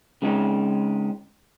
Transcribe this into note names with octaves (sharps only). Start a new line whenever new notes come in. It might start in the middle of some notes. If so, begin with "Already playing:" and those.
C#3 G#3 C4 C#4 D#4